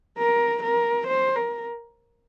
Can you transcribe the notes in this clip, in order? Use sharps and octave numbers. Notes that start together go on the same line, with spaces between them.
A#4
A#4
C5
A#4